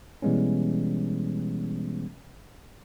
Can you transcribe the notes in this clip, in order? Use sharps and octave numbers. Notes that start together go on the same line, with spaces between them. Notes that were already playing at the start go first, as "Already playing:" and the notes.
B2 E3 G3 G#3 B3 C#4